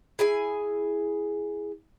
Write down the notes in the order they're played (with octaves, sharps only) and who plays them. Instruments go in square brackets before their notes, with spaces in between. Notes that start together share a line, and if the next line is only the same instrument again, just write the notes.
[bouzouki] E4 G#4 G#5